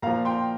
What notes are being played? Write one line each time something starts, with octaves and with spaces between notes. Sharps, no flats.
A#2 F3 F5 A#5
G5 C6